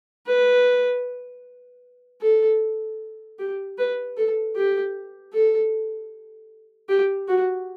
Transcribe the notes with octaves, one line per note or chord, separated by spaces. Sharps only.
B4
A4
G4
B4
A4
G4
A4
G4
F#4